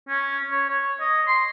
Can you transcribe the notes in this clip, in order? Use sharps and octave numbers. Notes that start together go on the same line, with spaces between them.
C#4
C#5
C#5
D#5
C6